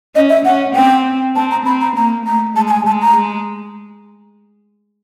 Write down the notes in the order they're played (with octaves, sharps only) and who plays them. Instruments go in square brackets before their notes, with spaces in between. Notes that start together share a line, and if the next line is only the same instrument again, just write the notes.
[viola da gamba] C#4 [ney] D#5
[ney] E5
[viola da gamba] C#4 [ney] F#5
[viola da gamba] C4 [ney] G5
[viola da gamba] C4 [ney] A5
[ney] A#5
[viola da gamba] C4 [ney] B5
[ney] A#5
[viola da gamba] A#3 [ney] A#5
[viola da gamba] A3 [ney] A#5
[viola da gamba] G#3 [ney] A5
[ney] A5
G#5
[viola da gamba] G#3 [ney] A5
[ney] A#5
[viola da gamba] G#3